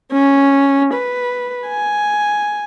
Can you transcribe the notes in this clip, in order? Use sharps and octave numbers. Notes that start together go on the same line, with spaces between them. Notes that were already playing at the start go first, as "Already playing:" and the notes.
C#4
B4
G#5